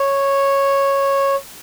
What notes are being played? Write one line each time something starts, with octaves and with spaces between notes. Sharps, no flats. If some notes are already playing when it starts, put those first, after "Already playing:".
Already playing: C#5